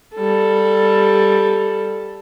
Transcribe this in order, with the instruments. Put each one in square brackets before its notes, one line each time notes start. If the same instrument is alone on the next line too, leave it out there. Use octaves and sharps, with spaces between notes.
[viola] G3 A4